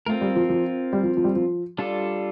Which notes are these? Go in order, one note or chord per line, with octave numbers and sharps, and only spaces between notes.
A3 C4 F4 A#4
G3
F3
F3
G3
F3
F3
G3
F3
G3 D4 F4 A4